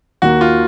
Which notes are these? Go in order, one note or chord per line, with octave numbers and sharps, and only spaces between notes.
D#2 D#3 A#3 F#4
F4